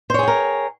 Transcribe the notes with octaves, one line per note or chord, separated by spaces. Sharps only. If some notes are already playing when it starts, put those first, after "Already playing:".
G#4 A#4 C5 C#5 G5